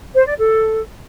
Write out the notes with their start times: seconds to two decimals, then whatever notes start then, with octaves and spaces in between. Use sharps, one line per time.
0.15 C5
0.26 D5
0.38 A4